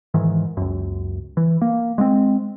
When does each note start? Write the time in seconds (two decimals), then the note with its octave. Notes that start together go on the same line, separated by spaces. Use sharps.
0.14 G#2 D#3 E3
0.57 C#2 F#2
1.37 E3
1.62 A#3
1.98 G#3 A#3 C4